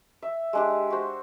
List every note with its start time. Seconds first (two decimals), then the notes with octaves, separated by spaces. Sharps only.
0.22 E5
0.53 G#3 D4 G4
0.90 F#4 C5